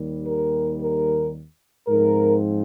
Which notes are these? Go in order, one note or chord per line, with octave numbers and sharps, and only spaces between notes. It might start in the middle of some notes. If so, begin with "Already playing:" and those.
Already playing: D#2 D#3 G3
A#4
A#4
G#2 F3 C4 A#4